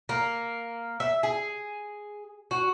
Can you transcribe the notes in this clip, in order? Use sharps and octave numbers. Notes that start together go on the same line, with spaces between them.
A#3
E5
G#4
F#4